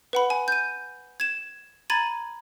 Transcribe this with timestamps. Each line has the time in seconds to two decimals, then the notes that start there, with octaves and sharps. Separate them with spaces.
0.13 B4 F#5 B5
0.30 G#5
0.48 G6 D#7
1.20 G#6 E7
1.90 A#5 B5 G#6 A6 D#7 F#7